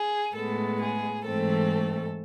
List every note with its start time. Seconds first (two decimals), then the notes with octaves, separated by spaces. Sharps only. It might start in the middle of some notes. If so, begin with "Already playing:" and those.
Already playing: G#4
0.35 A2 G#3 B3 A4
0.81 G#4
1.25 G#2 E3 A3 C4 A4